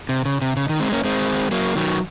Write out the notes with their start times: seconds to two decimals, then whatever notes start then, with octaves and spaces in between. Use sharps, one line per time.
0.09 C3
0.25 C#3
0.42 C3
0.57 C#3
0.69 D#3
0.80 G#3 C4
0.92 A#3 C#4
1.04 G#3 C4
1.51 F#3 A#3
1.76 D#3 F#3